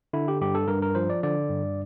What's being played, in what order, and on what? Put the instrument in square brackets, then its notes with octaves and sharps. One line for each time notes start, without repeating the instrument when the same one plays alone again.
[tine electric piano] D3 E4
G4
G2 G4
A4
G2 A#4
A#4
F3 C5
D5
D3 D5
G2